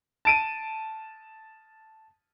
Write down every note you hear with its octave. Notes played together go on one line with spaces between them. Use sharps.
A5 D7 D#7